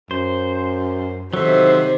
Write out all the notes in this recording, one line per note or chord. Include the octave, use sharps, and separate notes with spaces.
F#2 C5
C3 D#3 F#3 A4 C5 E5